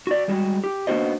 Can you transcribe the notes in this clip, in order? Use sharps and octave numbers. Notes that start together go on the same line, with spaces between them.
F#4 D5
G3 G#3 F#4
G4
A#3 B3 D4 F#4 C5 D#5